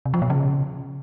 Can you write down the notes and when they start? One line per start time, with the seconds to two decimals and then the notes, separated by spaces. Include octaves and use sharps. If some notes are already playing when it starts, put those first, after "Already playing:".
0.06 C3
0.14 F3
0.22 B2
0.30 C#3